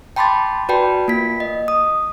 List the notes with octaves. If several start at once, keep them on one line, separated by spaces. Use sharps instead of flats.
G5 A5 B5 C6 D6 A6
F#4 B4 D5 G5 A5 B5
A#3 F4 B6
D#5
D#6